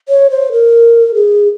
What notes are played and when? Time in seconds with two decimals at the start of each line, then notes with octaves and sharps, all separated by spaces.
0.08 C#5
0.30 C5
0.52 A#4
1.14 G#4